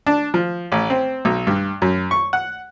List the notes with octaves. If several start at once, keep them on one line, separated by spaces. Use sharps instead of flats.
D4
F3
A1
C4
B1
G2
F#2
C#6
F#5